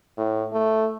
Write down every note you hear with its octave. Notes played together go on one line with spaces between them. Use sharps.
A2
A3